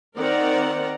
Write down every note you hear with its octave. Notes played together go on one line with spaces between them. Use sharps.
D#3 C4 A#4 D5 F#5 A#5